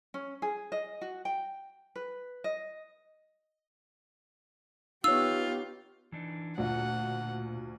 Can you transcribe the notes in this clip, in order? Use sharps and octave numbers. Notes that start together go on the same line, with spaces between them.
C#4
G#4
D#5
F#4
G5
B4
D#5
B3 D#4 F4 G4 C#5 E6
E3 D4 D#4
D2 A#2 F4 F#5